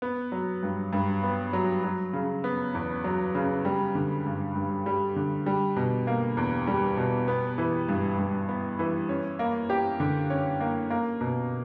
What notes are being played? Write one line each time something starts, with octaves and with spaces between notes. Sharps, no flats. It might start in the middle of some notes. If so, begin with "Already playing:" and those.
B3
F#3
G2
G2
B3
F#3
F#3
C#3
B3
E2
F#3
C#3
G3
D3
G2
G2
G3
D3
G3
B2
A#3
E2
G3
B2
B3
E3
G2
G2
B3
E3
C#4
A#3
G4
D3
C#4
A#3
A#3
B2